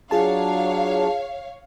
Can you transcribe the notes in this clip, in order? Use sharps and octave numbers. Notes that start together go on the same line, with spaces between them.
F#3 D4 F4 G#4 C#5 F5 A5